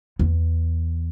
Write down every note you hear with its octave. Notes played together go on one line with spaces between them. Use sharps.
E2